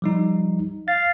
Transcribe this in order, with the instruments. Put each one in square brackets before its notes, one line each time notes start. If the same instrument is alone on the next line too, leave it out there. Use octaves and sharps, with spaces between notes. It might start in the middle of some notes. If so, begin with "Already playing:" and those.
[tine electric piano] F3 G3 D#4
[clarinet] F5 [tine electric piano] A6